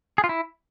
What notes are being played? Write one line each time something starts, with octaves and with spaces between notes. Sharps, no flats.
G#4
F4
E4